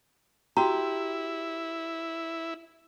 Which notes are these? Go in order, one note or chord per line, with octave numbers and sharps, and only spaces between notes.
E4 F#4 G4 A#5